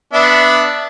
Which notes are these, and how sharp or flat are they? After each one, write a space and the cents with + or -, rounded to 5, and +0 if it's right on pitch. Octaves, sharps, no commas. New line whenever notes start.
B3 +0 D4 +0 E5 +0